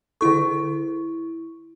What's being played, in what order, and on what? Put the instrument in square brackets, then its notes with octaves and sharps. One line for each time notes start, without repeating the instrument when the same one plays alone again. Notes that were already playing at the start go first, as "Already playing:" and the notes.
[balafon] D3 G#4 A4 [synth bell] E4 C#6